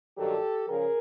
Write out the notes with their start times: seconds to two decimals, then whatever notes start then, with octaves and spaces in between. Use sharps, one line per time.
0.17 G2 D#3 F#3 G4 A4
0.67 C#3 F3 G#4 A#4